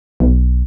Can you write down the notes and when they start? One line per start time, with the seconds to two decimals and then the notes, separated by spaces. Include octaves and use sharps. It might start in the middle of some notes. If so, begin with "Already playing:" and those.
0.20 B1